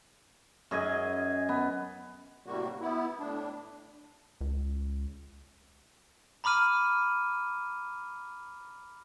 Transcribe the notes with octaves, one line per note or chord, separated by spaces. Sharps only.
F#2 G#4 D#5 G#5
B3
A2 C3 G3 A#3 F#4
B3 E4
A2 D4
C#2
A#5 B5 D6 F6 D#7